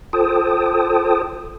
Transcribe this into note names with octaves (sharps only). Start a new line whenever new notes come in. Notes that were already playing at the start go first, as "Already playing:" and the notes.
F4 A4 C5 G5 A5 D#6